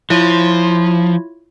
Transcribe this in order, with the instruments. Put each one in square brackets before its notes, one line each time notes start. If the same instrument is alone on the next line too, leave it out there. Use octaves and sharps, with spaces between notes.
[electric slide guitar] F3 [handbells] E4 F4 C#5